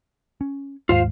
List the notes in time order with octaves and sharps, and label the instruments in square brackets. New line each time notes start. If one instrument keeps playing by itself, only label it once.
[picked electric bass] C#4
[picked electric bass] D#2 G#2 [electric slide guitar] F4 C5 F5